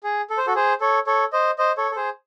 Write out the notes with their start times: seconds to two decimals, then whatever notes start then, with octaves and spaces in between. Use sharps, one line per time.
0.04 G#4
0.30 A4
0.38 C5
0.47 F#4 A4
0.55 G#4 C5
0.81 A4 C#5
1.07 A4 C#5
1.33 C5 D#5
1.58 C5 D#5
1.77 A4 C#5
1.91 A4
1.96 G#4 C5